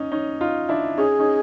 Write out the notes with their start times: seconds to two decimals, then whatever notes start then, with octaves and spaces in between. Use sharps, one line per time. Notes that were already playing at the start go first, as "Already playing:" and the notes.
Already playing: C#4 D#4
0.12 C#4 D#4
0.41 D#4 F4
0.69 D4 E4
0.97 C#4 D#4 G#4
1.19 C#4 D#4